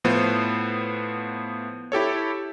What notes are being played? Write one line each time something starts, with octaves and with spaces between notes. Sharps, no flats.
A2 F3 B3 C5
E4 G4 A4 C#5